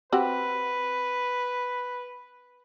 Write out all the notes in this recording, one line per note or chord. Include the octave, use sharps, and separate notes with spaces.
C4 F#4 G4 B4